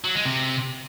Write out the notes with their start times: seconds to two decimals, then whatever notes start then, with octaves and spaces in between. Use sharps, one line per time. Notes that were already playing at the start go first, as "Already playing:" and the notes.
0.05 F#3
0.15 G#3
0.25 C3